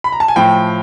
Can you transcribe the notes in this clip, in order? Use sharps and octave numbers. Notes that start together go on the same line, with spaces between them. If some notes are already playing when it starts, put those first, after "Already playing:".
B5
A#5
A5
G#5
A2 F3 G5